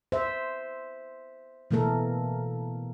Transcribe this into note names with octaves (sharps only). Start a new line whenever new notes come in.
C5 E5
B2 E3 A3 A#3 A4 A#4